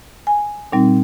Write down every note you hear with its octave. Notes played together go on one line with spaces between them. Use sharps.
G#5
A#2 G3 C4 D#4